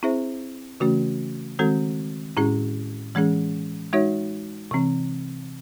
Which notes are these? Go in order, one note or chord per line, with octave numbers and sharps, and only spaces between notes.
C4 E4 G#4 C5 E5
C#3 E3 A3 C#4 F#4
D#3 G#3 C4 F#4 A4
A2 G#3 C#4 E4 G#4
E3 G#3 C#4 G#4
G#3 D#4 F#4 C#5 E5
C3 E3 C4